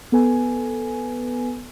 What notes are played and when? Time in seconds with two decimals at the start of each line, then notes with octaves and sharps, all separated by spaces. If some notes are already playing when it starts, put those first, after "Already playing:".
0.12 B3 A4 B4 G#5